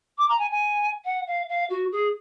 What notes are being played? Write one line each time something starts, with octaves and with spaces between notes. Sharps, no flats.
D6
A#5
G#5
G#5
F#5
F5
F5
F#4
G#4